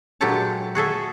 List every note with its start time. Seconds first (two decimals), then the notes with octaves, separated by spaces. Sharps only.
0.21 A#2 F#3 G#3 G4 A4 A5
0.75 F#4 G#4 A4 E5